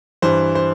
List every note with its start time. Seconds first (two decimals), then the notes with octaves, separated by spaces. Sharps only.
0.22 G2 E3 C5
0.55 C5